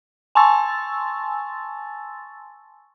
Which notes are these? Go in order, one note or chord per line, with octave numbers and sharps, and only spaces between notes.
G#5 A5 C6 C#6 E6 A6